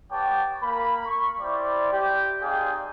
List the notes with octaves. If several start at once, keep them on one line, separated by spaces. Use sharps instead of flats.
B3 G4 C#5 G5 A5 D6
A#3 B5
C#6
G3 E4 C5 D5
G4
C4 D#4 G#4 D5 F5 G5